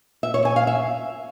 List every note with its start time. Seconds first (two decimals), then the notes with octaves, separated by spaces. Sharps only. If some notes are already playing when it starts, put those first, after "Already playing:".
0.23 E5
0.34 C#5
0.45 G#5
0.56 F5
0.67 E5